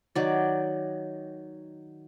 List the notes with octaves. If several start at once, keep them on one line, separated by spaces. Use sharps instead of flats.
D#3 F#3 D5